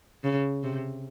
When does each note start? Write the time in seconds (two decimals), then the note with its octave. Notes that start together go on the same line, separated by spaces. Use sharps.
0.24 C#3
0.63 C3